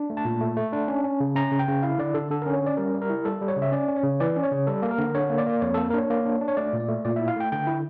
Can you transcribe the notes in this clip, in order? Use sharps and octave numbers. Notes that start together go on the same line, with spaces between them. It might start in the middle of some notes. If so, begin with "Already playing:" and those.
Already playing: D4
A3
A5
A#2
A3
A3
D4
C#4
C#4
C#3
C#4 A#5
C#3
G5
C#3
E4 F5
D3 D5
D3 A4
D3 A4
C#4 A#4
C#5
C#4 D5
G3 A#4
G3
A#4
E4
G3 A4
G3
C#5
C#3
E5
C#4 D5
C#4
C#5
C#3
E3 D5
C#4
C#5
C#3
G3 A4
A#3
A#4
D3
D3 C#5
A#3
D5
A#3
F2 C#5
A#3 A4
A#4
D4 C#5
A#3
D4
D4
C#5
A3 D5
A#2
D5
A3
A#2 D5
E4 E5
F5
A3 G5
D3 G5
E4